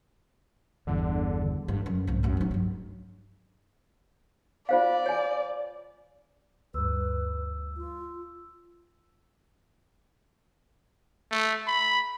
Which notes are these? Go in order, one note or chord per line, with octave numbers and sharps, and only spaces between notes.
G1 E2 D3
G2
F#2
C2 G#2
F#2 A2
F#3 D#4
G2 F#3
F4 C5 D5 F5
C#5 G#5
D2 G2 B4 E6
F4
A3
B5